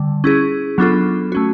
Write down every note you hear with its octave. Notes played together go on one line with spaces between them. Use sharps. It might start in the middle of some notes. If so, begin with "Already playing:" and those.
Already playing: D3 G3
C#4 E4 G#4
F#3 B3 D4 F4 A4
A3 C#4 F#4